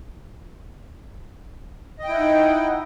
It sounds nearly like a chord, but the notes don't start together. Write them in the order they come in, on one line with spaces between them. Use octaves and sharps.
D#5 G5 E4 F#5 D#4